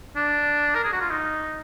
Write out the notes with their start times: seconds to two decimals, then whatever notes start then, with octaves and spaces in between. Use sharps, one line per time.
0.16 D4
0.75 A#4
0.84 G#4
0.92 F#4
1.01 F4
1.10 D#4